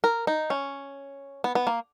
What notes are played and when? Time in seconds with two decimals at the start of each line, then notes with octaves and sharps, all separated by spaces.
0.04 A#4
0.27 D#4
0.50 C#4
1.44 B3
1.55 B3
1.67 A#3